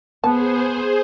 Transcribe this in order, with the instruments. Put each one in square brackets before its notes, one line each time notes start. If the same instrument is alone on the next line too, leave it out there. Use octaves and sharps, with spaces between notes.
[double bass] B3 [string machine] G#4 C5 [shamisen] A5